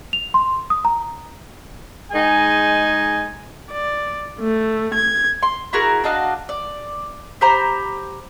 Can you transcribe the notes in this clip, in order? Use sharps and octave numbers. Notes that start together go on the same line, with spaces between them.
F7
C6
D#6
A#5
G#3 D#4 G#4 G#5
D5
A3
G#6
C6
E4 F#4 G#4 A#4
D4 F#4 D#5 F5
D5
G4 C5 A#5 B5